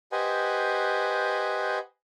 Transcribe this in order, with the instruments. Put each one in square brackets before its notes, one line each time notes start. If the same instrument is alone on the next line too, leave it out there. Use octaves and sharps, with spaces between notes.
[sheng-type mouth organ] G4 B4 C5 D#5 F#5 G#5